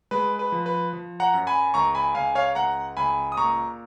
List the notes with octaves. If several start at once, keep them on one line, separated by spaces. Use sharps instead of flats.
G#3 B4
B4
F3
B4
F3
F#5 A#5
F#2
G#5 B5
C#2 A#5 C#6
G#5 B5
C#2 F5 G#5
C#5 F5
C#2 F#5 A#5
C#2 G#5 B5
D#6
A#2 A#5 C#6